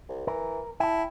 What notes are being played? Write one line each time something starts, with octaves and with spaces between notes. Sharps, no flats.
C2
E3 A#4
E4 G5 A5